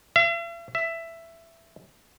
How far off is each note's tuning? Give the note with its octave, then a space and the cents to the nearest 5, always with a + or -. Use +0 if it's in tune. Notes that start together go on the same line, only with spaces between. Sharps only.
E5 +45
E5 +10